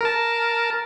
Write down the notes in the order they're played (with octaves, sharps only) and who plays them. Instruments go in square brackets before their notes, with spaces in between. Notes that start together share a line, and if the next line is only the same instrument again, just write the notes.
[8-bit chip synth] A#4 A5